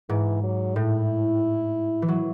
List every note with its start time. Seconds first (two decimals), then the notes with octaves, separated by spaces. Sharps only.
0.09 G#2 E3
0.43 F#3
0.76 A2 E4
2.02 E3
2.08 F#3